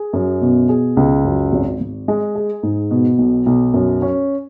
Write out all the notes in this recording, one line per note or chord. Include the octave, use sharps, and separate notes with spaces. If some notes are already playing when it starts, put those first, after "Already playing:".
Already playing: G#4
F#2
B2
G#4
C#2
F#2
G#1
G#1
G#3
G#4
G#2
B2
B1
B1
F#2
C#4